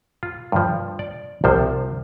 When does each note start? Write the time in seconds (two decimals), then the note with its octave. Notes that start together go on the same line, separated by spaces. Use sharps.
0.23 F4
0.52 G2 F3
0.99 D5
1.44 C2 C3 F3 C5